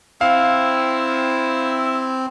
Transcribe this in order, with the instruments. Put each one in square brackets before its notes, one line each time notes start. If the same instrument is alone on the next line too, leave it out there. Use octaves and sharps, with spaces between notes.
[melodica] C4 [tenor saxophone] E4 [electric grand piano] F5